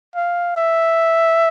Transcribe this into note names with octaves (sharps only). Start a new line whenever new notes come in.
F5
E5